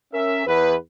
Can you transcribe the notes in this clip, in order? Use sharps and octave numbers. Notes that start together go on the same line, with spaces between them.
C#4 A#4 E5
E2 B4